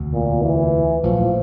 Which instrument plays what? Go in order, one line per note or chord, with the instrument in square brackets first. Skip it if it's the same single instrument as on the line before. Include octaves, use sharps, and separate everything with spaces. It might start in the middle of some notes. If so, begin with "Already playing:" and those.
Already playing: [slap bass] E1 D2 C3
[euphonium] A#2
E3
[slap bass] A#1 A#2 F#3 A3 [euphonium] F3